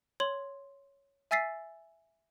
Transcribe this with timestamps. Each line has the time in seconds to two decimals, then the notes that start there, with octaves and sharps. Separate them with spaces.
0.20 C#5 C6 F#7
1.31 E5 G#5 E6 A6 B6 C7